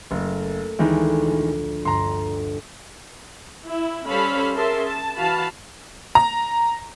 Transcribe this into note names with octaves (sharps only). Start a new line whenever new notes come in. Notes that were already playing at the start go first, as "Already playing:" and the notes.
F#1 A3 A#3 A#4
D2 D#3 E3 G#3 B5 F#6
A#1 F4
G1 G2 A#5 C6
E4
G3 C#4 A4 C5 F5 B5
C#4 G#4 A#4 E5 A5 C6
A5
E3 F#4 F5 A5 B5
A#5